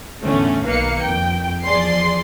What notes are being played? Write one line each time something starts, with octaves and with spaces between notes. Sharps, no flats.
E2 A2 D3 A3 C#4
B1 D#3 A#3 B4 F5 C#7
F2 G5
E2 F3 G#4 D5 C6 C7